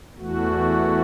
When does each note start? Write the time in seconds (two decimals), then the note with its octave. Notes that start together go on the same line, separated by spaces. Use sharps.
0.15 E2 E3 A3 F#4